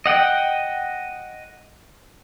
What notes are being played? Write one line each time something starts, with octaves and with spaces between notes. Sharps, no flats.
D#5 F#5 G5